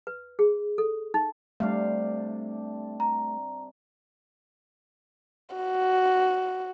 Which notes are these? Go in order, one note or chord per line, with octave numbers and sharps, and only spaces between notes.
B4
G#4
A4
D#4
C3 G3 A3 D4 F5
A#5
F#4